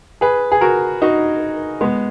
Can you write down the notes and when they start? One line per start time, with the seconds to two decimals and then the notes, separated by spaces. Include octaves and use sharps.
0.21 G#4 B4
0.52 G#4
0.61 F#4 A#4
1.02 D#4 F#4
1.81 G#3 B3